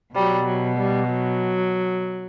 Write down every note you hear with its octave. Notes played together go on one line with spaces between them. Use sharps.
B2 F#3 G3
F#3
G3
F#3